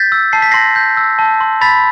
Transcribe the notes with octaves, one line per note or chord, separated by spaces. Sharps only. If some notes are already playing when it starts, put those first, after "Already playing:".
Already playing: G6 A6 B6
E6
A5 C7
B6
C6 A#6 C7
G6
E6
A5
C6
B5 A6 B6